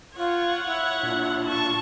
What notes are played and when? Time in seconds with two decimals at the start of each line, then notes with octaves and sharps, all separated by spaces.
0.17 F4 C#5 F#5
0.65 E4
1.03 A#2 D4 F4
1.46 A5 C#6